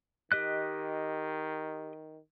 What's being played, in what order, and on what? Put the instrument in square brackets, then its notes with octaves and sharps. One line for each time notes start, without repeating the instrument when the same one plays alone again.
[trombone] D#3 [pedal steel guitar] G4 D#5 F#6